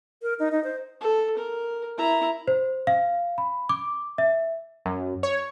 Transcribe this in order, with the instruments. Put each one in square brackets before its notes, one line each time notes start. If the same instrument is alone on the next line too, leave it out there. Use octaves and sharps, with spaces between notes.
[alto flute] A#4
D#4
D#4
C5
[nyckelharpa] A4
A#4
E4 A#5
[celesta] C5
F5
B5
D6
E5
[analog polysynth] F#2
C#5